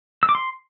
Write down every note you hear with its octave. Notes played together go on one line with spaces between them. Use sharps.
E6
D6
C6